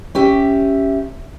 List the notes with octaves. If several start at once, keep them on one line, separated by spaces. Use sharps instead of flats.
C#4 G4 E5